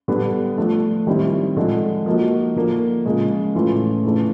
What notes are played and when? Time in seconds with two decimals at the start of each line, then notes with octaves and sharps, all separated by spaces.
0.08 D3 G3 B3 D4
0.57 F3 A3 D4
1.07 D#3 G3 C4 E4
1.57 D3 F3 G#3
2.06 F3 A#3 D#4 F#4
2.56 D3 F3 A#3
3.05 C#3 F3 G#3
3.55 A2 E3 A3 C#4 F4
4.04 C#3 E3 A3 D4